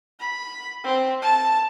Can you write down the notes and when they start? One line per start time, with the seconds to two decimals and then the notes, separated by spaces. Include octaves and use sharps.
0.19 B5
0.84 C4
1.22 A5